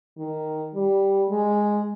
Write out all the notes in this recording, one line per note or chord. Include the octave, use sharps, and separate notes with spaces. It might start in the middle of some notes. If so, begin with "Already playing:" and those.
D#3
G3
G#3